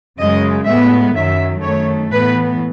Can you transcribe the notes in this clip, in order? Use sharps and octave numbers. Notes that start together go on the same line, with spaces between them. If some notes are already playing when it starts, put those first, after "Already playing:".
F#2 C#3 G#3 D#5
A2 G#3 B3 E5
F#2 D#3 F#3 E5
F#2 D#3 A3 C#5
A2 E3 B3 B4